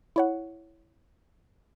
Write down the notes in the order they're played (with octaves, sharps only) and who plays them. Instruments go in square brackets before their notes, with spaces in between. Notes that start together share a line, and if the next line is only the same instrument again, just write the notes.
[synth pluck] E4 C#5 F#5